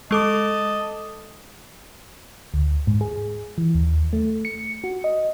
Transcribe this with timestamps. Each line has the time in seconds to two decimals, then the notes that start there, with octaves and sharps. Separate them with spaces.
0.11 G#3 A4 D#5 A5 D6
2.54 D2
2.87 G#2
3.01 G#4
3.58 E3
3.75 D#2
4.13 A3
4.45 C#7
4.84 F#4
5.04 D#5